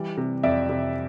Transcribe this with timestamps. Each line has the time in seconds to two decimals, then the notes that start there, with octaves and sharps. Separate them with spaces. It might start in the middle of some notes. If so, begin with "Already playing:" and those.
Already playing: E3 G3 D5
0.17 C3
0.43 F2 D5 E5
0.69 C3